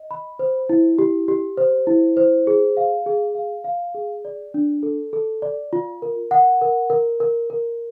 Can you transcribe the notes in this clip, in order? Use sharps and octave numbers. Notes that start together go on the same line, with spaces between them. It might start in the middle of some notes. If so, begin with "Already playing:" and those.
Already playing: D#5
B5
C5
E4
G4
G4
C5
E4
C5
G#4
F5
G#4
F5
F5
G#4
D5
D4
A4
A4
D5
F4
A#4
F#5
A#4
A#4
A#4
A#4